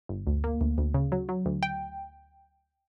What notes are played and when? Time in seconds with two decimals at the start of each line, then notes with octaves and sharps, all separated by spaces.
0.09 G1
0.27 D2
0.44 A#3
0.61 D2
0.78 D2
0.94 C#3
1.12 F#3
1.29 F#3
1.46 D2
1.63 G5